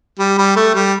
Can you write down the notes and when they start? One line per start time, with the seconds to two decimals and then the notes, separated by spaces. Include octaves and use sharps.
0.19 G3
0.38 G3
0.56 A3
0.75 G3